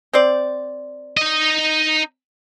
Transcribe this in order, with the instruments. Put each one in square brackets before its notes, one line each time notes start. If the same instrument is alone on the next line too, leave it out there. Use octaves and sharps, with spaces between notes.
[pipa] C4 C5 D5
[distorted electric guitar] D#4 D#5